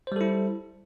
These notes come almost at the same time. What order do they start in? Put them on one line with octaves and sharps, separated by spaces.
C5 G3 A4 E4